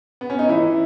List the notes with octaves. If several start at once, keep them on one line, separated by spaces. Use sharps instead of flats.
B3
C#4
D#4
E3 E4